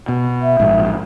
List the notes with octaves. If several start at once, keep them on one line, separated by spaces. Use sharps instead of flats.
B2
E5
A#1 G#2